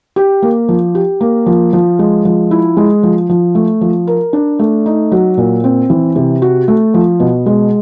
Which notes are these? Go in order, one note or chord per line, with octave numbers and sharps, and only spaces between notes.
G4
A#3
F3
G4
A#3
F3
F3
G#3
F3
E4
G#3
F3
F3
A3
F3
A#4
D4
A3
D#4
F#3
A#2
C4
E3
C3
F#4
A3
F3
B2
G#3